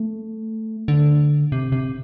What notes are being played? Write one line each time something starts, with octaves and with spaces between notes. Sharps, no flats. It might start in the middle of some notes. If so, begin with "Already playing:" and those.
Already playing: A3
D3
C3
C3